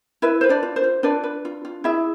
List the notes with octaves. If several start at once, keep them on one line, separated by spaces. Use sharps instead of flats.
E4 B4 E5
B4 C5
D4 D5
F4
C5
F4
D4 B4 D5
B4
F4
F4
E4 G#4 E5